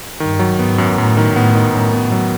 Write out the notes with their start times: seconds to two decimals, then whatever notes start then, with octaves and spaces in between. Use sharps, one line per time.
0.20 G2 D#3
0.39 F#3
0.59 G#2 B3
0.78 F#2
0.97 F#2 A2
1.17 D#3
1.36 A2 B3
1.55 D#3
1.74 F#2 A2
1.93 B3
2.12 F#3